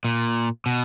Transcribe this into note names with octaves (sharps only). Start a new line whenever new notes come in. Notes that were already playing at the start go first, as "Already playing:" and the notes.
A#2
B2